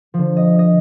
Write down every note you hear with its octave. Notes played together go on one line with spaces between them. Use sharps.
D3 F3
D#5
D#5